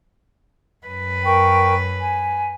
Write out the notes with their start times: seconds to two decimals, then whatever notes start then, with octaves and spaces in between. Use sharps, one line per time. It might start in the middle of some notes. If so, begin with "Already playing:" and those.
0.86 F#2 B4
1.25 A#4 G5 C#6
2.02 G#5